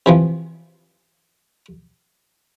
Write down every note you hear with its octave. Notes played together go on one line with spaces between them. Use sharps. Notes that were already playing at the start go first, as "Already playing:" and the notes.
C3 E3 F3